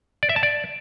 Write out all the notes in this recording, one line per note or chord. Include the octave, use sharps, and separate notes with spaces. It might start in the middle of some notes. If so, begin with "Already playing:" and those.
D5
E5
A5
D5